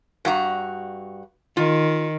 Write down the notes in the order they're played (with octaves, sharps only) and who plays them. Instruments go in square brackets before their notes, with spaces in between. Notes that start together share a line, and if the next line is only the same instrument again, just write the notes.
[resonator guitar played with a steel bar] G2 F#4 A#5
[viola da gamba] D#3 [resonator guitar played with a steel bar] F4